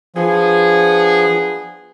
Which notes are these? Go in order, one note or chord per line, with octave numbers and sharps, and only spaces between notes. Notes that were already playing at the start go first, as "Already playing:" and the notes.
F3 B3 D4 G#4